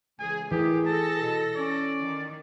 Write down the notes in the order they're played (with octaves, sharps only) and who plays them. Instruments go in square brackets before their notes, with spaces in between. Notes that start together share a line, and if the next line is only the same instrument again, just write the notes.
[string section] C#2 G#4 [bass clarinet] E3 [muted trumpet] G#5
[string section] A2 D#3 [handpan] E3 [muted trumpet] G4 [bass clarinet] G#4
[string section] A4 A#6 [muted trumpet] A5
[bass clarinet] B2
[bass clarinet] C#4 [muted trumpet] D5
[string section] D#3